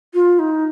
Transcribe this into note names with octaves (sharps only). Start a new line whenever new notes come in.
F4
D#4